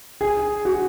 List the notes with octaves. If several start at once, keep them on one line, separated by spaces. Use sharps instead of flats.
G#4
F#4